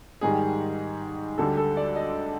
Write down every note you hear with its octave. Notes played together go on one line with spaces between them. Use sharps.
G#2 D#3 G3 G#4
D2 D3 G3 A4
A4
D5
D#5